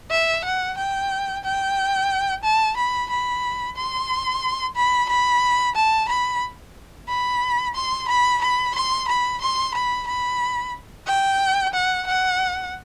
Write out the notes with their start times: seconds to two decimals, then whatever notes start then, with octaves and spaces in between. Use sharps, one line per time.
0.11 E5
0.44 F#5
0.77 G5
1.44 G5
2.43 A5
2.77 B5
3.10 B5
3.76 C6
4.76 B5
5.09 B5
5.75 A5
6.09 B5
7.08 B5
7.75 C6
8.08 B5
8.41 B5
8.75 C6
9.08 B5
9.41 C6
9.74 B5
10.08 B5
11.07 G5
11.74 F#5
12.07 F#5